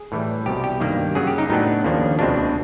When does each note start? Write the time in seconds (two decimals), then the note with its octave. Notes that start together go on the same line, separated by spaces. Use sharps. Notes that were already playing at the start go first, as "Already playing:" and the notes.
Already playing: G#4
0.12 A2 E3 G3
0.46 C2 B2 G3 G4
0.64 G4
0.81 G2 D#3 G3 A#3
1.15 F#2 C#3 F#3 G#4
1.27 G4
1.38 D#4
1.50 A2 F#3 B3 D4 D#4
1.84 D#2 C#3 F3 A#3 D4
2.19 C#2 B2 G#3 C4 D4